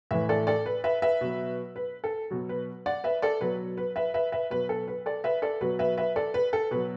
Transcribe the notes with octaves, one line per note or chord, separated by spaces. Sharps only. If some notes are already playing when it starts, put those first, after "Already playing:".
A2 E3 B4 E5
A4 D5
A4 D5
B4
B4 E5
B4 E5
B2 F#3
B4
A4
B2 F#3
B4
D5 F#5
B4 E5
A4 D5
B2 F#3 B4
B4
B4 E5
B4 E5
B4 E5
B2 F#3 B4
A4
B4
A4 D5
B4 E5
A4 D5
B2 F#3 B4
B4 E5
B4 E5
A4 D5
B4
A4
B2 F#3 B4